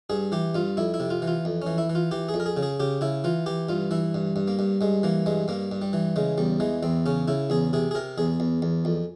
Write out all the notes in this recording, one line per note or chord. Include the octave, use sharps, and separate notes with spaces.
G2 G#4
E3 G4
G2 F4
F2 E4
E4
C3
F4
E3
F4
F2
E3 C#4
E4
E3
F4
E3 G4
G#4
F2
A#4
G#4
C#3
G#4
C#3 G4
C#3 E4
E3 F4
E3 G4
G2 F4
E3 E4
G2
G2
A#3
G2
G2 G#3
E3 A#3
G2 G#3
G2 A#3
G2
G3
E3
C#3 G#3
E2 G3
E3 G#3
E2 C4
C#3 C#4
C#3 E4
E2 G#4
C3 G#4
G#4
C3 A#4
E2 G#4
E2
E2
F2